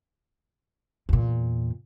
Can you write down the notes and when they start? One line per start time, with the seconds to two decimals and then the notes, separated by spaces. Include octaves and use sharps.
1.09 E2 A#2